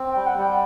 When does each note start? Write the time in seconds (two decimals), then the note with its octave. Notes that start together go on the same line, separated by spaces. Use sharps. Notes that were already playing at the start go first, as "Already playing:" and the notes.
Already playing: C4
0.10 G5
0.16 G3
0.26 F#5
0.38 G3
0.43 G5